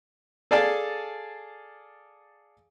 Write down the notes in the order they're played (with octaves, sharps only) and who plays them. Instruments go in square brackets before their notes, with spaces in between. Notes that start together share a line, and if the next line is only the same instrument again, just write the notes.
[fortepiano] G#4 A4 D5 F5 G#5 A5